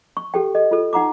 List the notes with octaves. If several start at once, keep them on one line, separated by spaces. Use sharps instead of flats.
C#6
G4 A4 G5
A4 D#5
F4 A4
D#4 F#5 A#5 D6